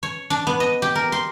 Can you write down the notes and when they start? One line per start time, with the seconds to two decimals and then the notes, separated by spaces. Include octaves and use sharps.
0.03 C#5
0.30 D4
0.47 B3
0.60 D#5
0.82 G4
0.95 A#4
1.12 C6